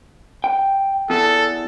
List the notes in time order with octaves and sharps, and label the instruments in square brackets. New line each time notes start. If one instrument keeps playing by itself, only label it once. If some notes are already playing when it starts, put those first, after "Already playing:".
[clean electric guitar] G5
[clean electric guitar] E2 [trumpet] A4